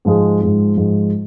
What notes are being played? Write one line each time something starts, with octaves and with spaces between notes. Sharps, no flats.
G#2 F3 G#3
G#2 F3 G#3
G#2 F3 G#3